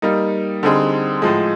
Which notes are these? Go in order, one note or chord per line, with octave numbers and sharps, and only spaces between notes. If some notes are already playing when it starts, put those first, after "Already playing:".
G3 A#3 D#4
D3 G3 C4 D#4 G#4
A2 F3 G#3